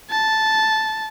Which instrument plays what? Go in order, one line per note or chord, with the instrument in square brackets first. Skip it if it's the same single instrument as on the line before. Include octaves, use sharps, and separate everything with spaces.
[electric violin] A5